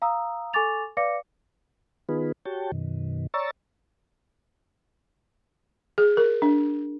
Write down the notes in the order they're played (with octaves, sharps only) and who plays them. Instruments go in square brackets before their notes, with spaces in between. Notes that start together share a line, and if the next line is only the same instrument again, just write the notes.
[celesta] F5 A#5 D#6 E6
A4 G#5 C#6 D6 A6 F7
B4 D5 F5 D6 A#6 C#7
[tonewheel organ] D#3 B3 D#4 F4 G#4 B4
F#4 G4 C#5 G5 A5
F#2 B2 D#3
C#5 D5 A#5 C#6 E6 A6
[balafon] G#4
A#4
D4